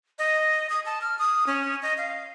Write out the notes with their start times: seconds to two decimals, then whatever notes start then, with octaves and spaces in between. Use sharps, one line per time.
0.19 D#5
0.70 D#6
0.86 A5
1.02 F6
1.19 D#6
1.47 C#4
1.82 D#5
1.98 F5